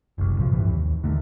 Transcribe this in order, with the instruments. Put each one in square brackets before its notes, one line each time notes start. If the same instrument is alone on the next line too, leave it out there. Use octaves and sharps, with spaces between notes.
[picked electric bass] F#1 C2
A2 C3 F3
C2 G2 E3
D#2
D#2 D3 D#3 A3